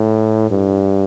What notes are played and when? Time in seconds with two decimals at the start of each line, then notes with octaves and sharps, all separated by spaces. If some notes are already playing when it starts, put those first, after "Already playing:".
Already playing: A2
0.50 G2